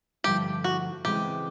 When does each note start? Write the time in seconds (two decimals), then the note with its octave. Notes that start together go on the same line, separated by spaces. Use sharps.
0.24 G2 D3 F3 A3 G4
0.64 F#4
1.05 C#3 E3 G#3 C4 G4